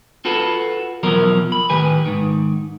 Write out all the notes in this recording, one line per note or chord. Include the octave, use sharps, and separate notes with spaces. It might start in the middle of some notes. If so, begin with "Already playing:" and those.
F4 F#4 A4 B4
E2 B2 F3 F#3 A#4
B5
A2 D#3 G4 B4 G#5
G#2 D#3